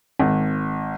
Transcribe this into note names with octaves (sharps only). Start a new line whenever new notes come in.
G#1